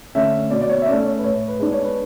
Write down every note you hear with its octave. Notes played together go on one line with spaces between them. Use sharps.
D3 A3 C#4 E5
B2 D5
D5
C#5
E5
A3 C#4 D5
C#5
B4
A2 C#5
B4
G#3 B3 D4
C#5
B4